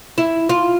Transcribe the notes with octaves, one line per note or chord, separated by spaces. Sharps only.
E4
F4